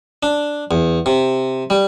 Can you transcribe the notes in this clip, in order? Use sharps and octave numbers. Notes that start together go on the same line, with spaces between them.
D4
E2
C3
G3